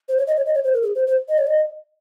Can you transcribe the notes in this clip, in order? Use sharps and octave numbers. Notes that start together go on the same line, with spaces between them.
C5
C#5
D#5
C#5
D#5
C#5
C5
A#4
G#4
C5
C5
D#5
C#5
D#5